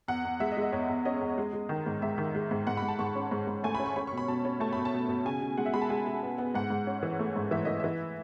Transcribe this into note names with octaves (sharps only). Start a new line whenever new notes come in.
E2 F#5
E2
G#3 E5
D#5
G#3
D#5
E2 C#5
E2
C#4 D#5
E2
G#3
G#3
D#3
G#2
G#2 E5
D#3
G#3
G#2
G#2 F#5
B5
G#2
A5
G#2 C#6
C#4
G#2
G#2
A3 G#5
B5
C#4
C#6
C#4 B5
C#6
B2
B5
B2 A5
C#4
A3 A5
B2 B5
A5
B2
B2
C#3 G#5
C#3
G#3 F#5
E5
G#3 B5
A5
G#3 G#5
G#3
B3
B3
G#2 F#5
G#2
C#4
E3
A3
G#2
E3 E5
E3 D#5
E3 E5